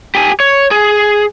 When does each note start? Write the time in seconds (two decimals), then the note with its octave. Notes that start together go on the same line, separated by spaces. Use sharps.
0.15 G4 G#5
0.40 C#5
0.71 G#4